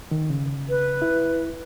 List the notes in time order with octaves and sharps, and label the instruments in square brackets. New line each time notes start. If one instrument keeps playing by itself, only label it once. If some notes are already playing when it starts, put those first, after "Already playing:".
[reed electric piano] D#3
C#3
[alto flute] B4
[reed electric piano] E4